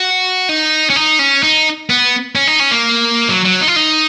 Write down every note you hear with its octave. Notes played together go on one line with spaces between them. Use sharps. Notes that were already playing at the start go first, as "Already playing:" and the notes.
Already playing: F#4
D#4
C#4
D#4
C#4
D#4
B3
C#4
D#4
C#4
A#3
F#3
F#3
D#4
F4
D#4